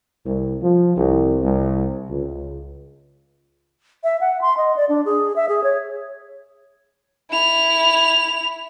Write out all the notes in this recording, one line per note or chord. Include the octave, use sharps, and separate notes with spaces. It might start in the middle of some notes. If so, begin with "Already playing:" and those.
C2
F3
C2
C2
C#2
E5
F#5
C6
D#5
D5
D4
G#4
E5
G#4
C#5
E4 F7